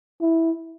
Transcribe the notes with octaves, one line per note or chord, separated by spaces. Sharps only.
E4